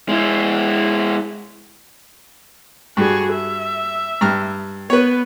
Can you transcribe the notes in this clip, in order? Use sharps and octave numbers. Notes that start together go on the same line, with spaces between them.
G#3 E4
G2 F#4 G#4
E5
G2 A#5 F6
B3 B4 C#5